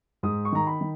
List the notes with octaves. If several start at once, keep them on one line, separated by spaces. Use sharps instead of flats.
G#2 D#6
C#6
D#3 A#5
B5
D#3